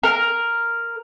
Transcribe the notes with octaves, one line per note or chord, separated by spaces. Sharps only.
A#4